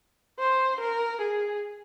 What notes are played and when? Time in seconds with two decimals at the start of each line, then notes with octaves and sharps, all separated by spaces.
0.40 C5
0.81 A#4
1.22 G#4